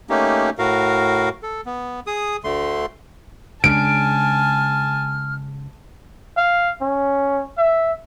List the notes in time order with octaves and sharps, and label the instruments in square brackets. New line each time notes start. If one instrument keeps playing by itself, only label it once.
[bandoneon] A3 A#3 C#4 D#4 G4
A2 F#4 A#4 F5
A4
B3
G#4 D#6
D2 D3 A3 C6
[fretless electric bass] C#3 G#3 D4 [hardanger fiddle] G#5 A5 [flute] F6 [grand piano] D7
[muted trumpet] F5
C#4
E5